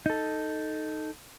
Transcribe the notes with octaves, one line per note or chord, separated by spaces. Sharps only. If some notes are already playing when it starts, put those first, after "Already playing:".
D#4 A4